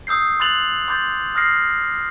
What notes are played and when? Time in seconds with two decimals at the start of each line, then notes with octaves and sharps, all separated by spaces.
0.07 D#6 E6 G6 C7
0.40 C6 F#6 A6 F7 F#7
0.88 C6 D6 G6 A6
1.35 D#6 F6 A#6 C7